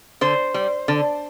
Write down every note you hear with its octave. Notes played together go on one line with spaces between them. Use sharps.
D3 C5
G3
D3